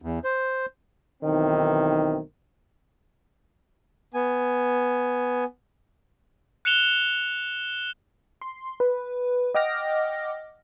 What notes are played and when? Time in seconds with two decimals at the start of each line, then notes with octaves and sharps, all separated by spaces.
0.02 E2
0.24 C5
1.23 B1 D#3 E3 C4
4.14 B3 G#5
6.65 F#6 C#7 E7 F7 G7
8.42 C6
8.80 B4
9.55 D#5 F#5 G5 D6 F6 A#6